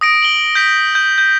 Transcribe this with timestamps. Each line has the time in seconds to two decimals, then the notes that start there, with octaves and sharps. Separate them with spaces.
0.01 D#6 A#6 D7
0.22 F#7 G7
0.55 G6 B6
0.95 G6
1.18 G6